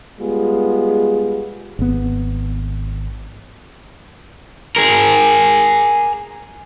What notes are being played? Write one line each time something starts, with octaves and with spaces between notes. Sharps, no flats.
G3 G#3 B3 F4 G#4
G#1 B3
G#4 A#4